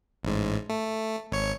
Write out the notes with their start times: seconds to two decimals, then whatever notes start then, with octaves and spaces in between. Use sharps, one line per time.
0.23 A1 G#2
0.69 A3
1.32 G#1 C#5 C#7